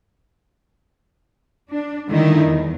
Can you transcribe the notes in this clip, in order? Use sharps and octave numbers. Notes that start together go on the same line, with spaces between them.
D4
D3 D#3 G3 A3 D#4 E4
E2